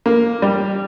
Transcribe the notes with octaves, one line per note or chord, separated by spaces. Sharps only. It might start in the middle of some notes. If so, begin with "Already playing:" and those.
A#3
G3